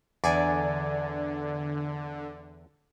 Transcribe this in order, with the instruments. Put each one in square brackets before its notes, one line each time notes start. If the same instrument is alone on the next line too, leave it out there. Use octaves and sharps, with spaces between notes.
[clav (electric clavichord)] E2 [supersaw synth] D3 [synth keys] D5 G#5